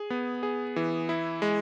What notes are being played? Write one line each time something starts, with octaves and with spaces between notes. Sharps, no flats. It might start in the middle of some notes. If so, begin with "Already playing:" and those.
Already playing: G#4
B3
G#4
E3
E4
G#3